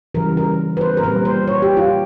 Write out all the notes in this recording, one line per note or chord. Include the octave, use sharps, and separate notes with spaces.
C#3 E3 G3 A#4
A#4
B4
C5
A#4
A#2 G3 C4 B4
C5
C#5
G4
F4